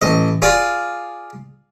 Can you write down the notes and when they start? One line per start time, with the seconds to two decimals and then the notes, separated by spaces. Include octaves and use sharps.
0.02 A1 D#5
0.42 F4 G#4 D5